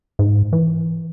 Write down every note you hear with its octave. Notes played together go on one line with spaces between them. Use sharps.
G#2
E3